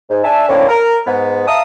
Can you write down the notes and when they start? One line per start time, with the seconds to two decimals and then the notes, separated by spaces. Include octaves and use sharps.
0.09 G#2
0.23 D4 E5 G#5 A5
0.49 F#2 A2 D3 A#3 C4 C#4
0.69 A#4
1.06 G#2 B3
1.47 E5 F5 A5 A#5 D#6